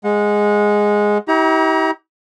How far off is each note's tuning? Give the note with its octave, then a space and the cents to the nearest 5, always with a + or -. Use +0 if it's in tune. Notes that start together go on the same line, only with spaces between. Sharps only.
G#3 +0 F#5 -30
E4 -45 G4 -25 A#5 +30